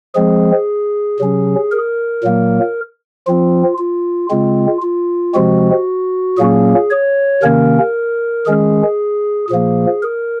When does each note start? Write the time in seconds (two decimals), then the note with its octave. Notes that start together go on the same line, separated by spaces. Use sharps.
0.15 F3 G#3 C4 G#4
1.19 C3 F#3 C#4
1.72 A#4
2.23 A#2 F#3 A#3
3.27 F3 C4 F4
3.78 F4
4.30 C#3 G#3 C4 F4
4.82 F4
5.35 C3 F3 G#3 C4 F#4
6.38 A#2 F#3 A#3 C#4 G#4
6.90 C#5
7.42 C3 D#3 A#3 C#4 A#4
8.46 D#3 G#3 C#4 G#4
9.49 A#2 F3 A#3 G#4
10.02 A#4